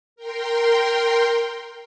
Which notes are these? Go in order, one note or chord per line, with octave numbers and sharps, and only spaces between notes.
A#4 G5 C6